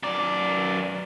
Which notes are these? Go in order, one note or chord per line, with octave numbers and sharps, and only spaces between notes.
F#2 D5